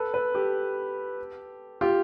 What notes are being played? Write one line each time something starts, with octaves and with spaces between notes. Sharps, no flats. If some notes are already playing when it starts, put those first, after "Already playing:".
Already playing: A4 B4
A4 B4
G4 A4
F4 G4